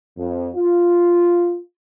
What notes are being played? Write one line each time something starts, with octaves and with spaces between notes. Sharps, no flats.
F2
F4